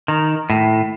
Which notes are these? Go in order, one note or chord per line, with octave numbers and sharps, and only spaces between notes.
D#3
A2